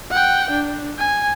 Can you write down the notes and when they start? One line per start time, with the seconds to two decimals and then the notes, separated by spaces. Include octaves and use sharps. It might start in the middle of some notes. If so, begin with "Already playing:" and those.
0.11 F#5 G5
0.51 D4
0.98 G#5